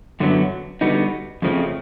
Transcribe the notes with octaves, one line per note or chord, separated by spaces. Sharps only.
F#2 D3 F#3 B3
D3 G3 B3 D#4 F#4
F2 C#3 F3 A3 C4